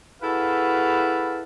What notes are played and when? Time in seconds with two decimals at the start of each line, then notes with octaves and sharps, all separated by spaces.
0.23 E4 F#4 G#4 A4 B4 F5